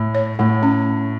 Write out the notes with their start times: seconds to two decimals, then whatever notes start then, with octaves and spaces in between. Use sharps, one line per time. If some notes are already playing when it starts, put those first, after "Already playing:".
Already playing: A2
0.15 C#5
0.39 A2 A3
0.63 C#4